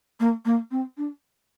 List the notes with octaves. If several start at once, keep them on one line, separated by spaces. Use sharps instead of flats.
A#3
A#3
C4
D4